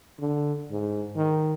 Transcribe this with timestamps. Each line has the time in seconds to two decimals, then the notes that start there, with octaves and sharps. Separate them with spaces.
0.20 D3
0.71 G#2
1.16 D#3